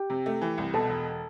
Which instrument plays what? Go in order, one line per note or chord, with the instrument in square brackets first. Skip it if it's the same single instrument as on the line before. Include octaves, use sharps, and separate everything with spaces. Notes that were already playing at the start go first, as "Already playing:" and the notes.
Already playing: [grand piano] G4 G5
[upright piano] C3
A3
E3
C2
[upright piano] B2 [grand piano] A4 A5
[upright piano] E1